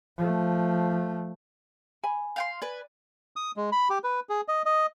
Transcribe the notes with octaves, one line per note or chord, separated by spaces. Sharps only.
F3 A3
G#5 B5
F5 G5 C6
B4 D5 G#5
D#6
G#3
B5
G4
B4
G#4
D#5
D#5